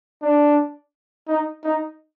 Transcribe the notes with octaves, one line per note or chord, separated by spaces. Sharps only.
D4
D#4
D#4